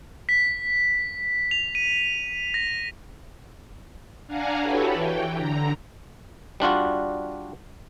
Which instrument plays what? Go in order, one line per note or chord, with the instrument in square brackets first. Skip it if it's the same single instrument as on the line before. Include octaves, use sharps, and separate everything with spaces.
[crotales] B6
F7
D#7
A#6
[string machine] D4 F5 F#5 G#5 A#5
E4 F#4 G4 A4 B4 C#5
E3 G5
D3 A#5
[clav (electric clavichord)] G3 D4 F4 F#4